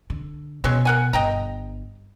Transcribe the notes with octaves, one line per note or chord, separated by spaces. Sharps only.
D3
B2 F#3 G#3 C#4
A#4 F#5 G#5
G1 D#5 G5 A#5